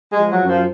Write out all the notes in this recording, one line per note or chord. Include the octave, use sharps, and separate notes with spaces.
G#3
F3
F#3
F#2
F3